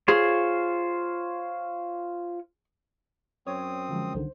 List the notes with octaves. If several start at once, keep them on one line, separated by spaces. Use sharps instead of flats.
F4 G#4 C5 C#5
F#2 C4 C#5 D#6
D3 F3 G#3
C2 D3 D#3 C5